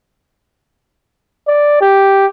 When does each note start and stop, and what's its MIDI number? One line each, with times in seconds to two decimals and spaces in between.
1.48 1.78 74
1.82 2.27 67